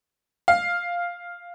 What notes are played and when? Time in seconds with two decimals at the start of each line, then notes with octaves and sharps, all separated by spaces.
0.48 F5